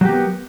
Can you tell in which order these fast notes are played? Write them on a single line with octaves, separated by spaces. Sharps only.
F#3 G4 A#3 B3